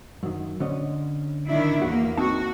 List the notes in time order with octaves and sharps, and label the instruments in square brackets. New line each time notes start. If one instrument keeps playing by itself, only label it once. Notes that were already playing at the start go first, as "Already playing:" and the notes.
[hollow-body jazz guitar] F#2 D#3
D3 C#4 D#5
[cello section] D#3 D4 E4
[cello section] E2 A#3 [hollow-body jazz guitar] F#4
[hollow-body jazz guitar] C4 D#4 A5 [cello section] F#4